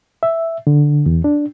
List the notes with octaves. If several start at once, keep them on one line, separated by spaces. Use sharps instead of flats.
E5
D3
E2
D4